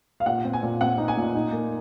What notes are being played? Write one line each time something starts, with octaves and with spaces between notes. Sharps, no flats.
F5
A#2 F#5
C4
G#5
A#2
C4 F#5
D#4
G#5
A#2
D#4
A#3